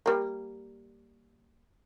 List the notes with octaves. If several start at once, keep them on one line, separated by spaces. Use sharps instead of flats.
G3 A#3